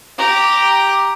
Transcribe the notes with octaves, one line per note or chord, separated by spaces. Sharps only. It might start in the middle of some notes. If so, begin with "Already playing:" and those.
G4 A#5